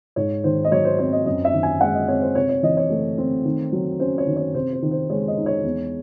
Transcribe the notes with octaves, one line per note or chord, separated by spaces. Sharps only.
G#2 C#5
D#3 C5
D#5
F#3 C#5
C5
C4 C#5
D#5
F#2 D#5
E5
D#3
G#5
G#3 F#5
D#5
C4 C#5
C5
C3 C#5
C#5
E3 D#5
C#5
A3
C4
D#3
F#3
C#4 C5
C#5
D#3
C#5
C3 C5
C5
D#3
C5
G#3 C#5
D#5
D#4
C#5
E2